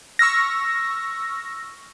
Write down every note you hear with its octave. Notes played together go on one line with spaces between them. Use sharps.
C#6 E6 F6 A#6